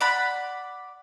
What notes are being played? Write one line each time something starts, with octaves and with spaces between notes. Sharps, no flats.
D5 F#5 B5